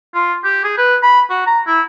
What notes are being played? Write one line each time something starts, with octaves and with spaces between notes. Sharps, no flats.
F4
G4
G#4
B4
B5
F#4
A#5
E4